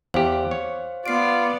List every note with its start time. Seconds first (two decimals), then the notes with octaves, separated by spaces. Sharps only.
0.14 E2 G4 C5 F5
0.51 C#5
1.06 B3 F4 D5 C7 D7